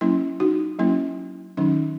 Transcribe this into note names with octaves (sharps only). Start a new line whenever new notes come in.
F#3 A#3 C#4 E4
D#4 F#4
F#3 A#3 C#4 E4
D#3 F#3 C#4 D#4